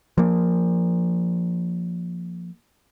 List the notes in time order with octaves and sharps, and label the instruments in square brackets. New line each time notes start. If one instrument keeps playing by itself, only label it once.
[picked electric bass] F3 A#3